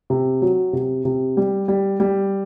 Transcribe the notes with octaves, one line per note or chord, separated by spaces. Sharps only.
C3
F#3
C3
C3
G3
G3
G3